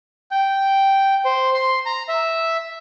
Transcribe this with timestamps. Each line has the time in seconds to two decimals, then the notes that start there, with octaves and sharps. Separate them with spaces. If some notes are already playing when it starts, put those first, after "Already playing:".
0.31 G5
1.25 C5
1.54 C6
1.86 A#5
2.08 E5